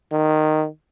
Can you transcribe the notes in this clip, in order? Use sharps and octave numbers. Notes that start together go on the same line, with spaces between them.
D#3